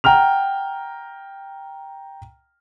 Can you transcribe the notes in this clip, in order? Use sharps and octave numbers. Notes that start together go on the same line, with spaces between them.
F#5 G5 A#5 F6 F7